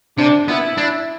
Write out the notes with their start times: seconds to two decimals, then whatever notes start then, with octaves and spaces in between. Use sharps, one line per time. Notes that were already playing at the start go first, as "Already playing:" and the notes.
0.18 C3 D4
0.48 B3 E4
0.77 D4